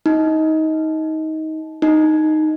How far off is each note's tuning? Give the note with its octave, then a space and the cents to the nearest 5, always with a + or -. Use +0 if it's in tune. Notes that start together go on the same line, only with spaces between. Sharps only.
D#4 +20
D#4 -5